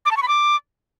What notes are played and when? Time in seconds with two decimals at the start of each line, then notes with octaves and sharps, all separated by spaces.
0.05 D6
0.11 A5
0.17 C#6
0.22 B5
0.28 D6